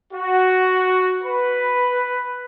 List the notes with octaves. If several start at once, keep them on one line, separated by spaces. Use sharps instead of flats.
F#4
B4